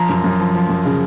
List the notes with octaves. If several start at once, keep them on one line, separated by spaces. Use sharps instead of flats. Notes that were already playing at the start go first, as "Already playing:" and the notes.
Already playing: F3 A#5
F#2
F#2
F3
F3
F#2
C#3